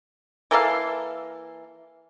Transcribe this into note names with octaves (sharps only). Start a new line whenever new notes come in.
E3 A#3 A4 F5